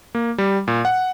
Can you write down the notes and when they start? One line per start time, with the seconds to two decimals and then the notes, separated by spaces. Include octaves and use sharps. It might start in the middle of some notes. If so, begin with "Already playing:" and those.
0.15 A#3
0.38 G3
0.68 A#2
0.85 F#5